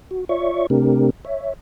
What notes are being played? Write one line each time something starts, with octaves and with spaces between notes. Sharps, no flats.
F#4
F4 C#5 D5 E5 C#6
C3 A3 C4 D4 G4 A#4
C#5 E5